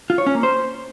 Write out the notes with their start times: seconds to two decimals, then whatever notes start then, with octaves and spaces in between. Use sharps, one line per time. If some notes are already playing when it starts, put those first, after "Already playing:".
0.10 F4
0.18 C#5
0.27 C#4
0.35 A#3
0.43 C5